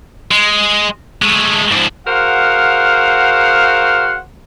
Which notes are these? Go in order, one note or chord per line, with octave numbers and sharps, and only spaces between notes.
G#3
G#3 A3
G#2 F3
F#4 G#4 A#4 C5 F5 F#5